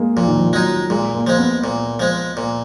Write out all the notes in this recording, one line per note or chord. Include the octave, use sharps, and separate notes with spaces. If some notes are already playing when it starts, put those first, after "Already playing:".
Already playing: G#3 A#3
A#2 F3
D#3
F3
F#3 G#3 D#4
A#2 G#3
A#3
F3 G#3
B3
A#2
F3 G#3
A#2